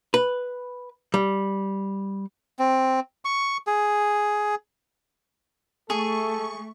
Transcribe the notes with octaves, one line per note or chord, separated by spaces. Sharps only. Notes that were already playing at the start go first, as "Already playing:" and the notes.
B4
G3
C4
C#6
G#4
A3 G#4 A4 C#6